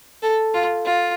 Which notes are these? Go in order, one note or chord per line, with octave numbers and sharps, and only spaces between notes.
A4
F4
F4